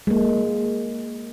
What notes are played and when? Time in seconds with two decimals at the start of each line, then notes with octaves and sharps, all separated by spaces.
0.07 G#3 A#3